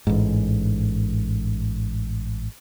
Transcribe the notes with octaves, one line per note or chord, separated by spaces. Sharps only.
A1 G#2